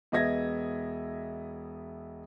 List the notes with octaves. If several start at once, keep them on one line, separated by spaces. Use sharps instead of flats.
E1 B3 D#5 E5 G#6 A#6